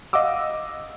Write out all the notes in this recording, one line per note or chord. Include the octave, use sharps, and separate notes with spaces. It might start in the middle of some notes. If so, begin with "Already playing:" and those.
D#5 F5 F#5 D6 E6